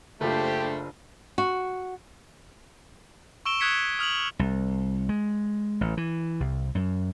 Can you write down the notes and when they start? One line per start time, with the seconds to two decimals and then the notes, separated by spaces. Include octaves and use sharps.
0.21 F#1 A3 D4 F4 G4 A4 C5
1.38 F#4
3.46 C#6 E6 D7 E7 G7
3.60 D#6 F#6 G#6 B6 C#7
3.99 D#6 F6 F7 F#7
4.39 C2
5.09 G#3
5.81 A1
5.97 E3
6.40 C2
6.75 F#2